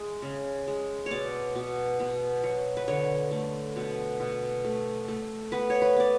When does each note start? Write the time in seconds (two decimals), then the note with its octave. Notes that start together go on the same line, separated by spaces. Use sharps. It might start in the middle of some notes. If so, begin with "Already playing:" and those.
Already playing: G#3
0.22 C#3
0.67 G#3
1.06 B2 C#5 D5
1.55 B2
2.00 B2
2.43 F#3
2.77 B4
2.88 D3 C#5
3.31 A3
3.76 B2
4.20 B2
4.65 A3
5.08 A3
5.52 B3 B4
5.70 C#5
5.82 B4
5.96 B3 D5